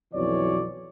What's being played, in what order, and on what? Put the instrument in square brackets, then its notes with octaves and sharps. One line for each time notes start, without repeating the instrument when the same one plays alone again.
[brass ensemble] B1 F2 B2 E3 C#5 D5